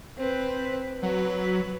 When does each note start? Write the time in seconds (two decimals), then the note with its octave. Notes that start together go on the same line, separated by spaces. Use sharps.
0.17 C4 B4
1.03 F#3 B4